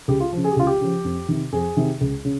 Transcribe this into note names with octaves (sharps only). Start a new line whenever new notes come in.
C#2 G4
F4
C#3 F3
G#4
G4
C#2 F4
G4
C#3 F3
F2
C3 D#3
F2 G#4
C3 D#3
C#2
C#3